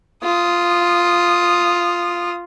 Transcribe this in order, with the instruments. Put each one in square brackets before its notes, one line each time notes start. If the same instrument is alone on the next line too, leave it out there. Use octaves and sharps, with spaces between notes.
[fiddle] F4 [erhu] D#6